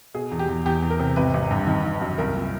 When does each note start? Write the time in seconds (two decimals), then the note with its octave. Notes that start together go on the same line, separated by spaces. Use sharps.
0.14 B2 G#4
0.31 E2
0.39 G4
0.49 E2
0.66 E2 G4
0.83 E2
0.90 A#4
0.99 C3
1.16 G#1 B4
1.34 G#1
1.51 G2
1.67 D#3
1.84 D#3
2.01 F#2
2.18 C2 A#4
2.36 A#2